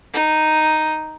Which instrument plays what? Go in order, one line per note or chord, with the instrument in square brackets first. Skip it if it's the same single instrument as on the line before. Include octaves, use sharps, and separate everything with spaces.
[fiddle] D#4